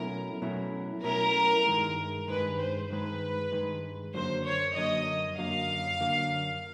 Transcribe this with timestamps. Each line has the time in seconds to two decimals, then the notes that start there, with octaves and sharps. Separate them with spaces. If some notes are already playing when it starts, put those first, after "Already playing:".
Already playing: B2 F#3 A3 C#4 E4 A#4
0.42 B2 F#3 A3 C#4 E4
1.04 B2 F#3 A3 C#4 E4 A#4
1.66 G2 D#3 G#3
2.28 G2 D#3 G#3 B4
2.59 C5
2.90 G2 D#3 G#3 B4
3.52 G2 D#3 G#3
4.14 F#2 D3 F#3 A#3 C5
4.45 C#5
4.76 F#2 D3 F#3 A#3 D#5
5.37 F#2 D3 F#3 A#3 F5
5.99 F#2 D3 F#3 A#3